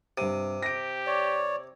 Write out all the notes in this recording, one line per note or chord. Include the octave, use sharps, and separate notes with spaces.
G2 C3 D#7
G4 A#6 D7
C#5 D5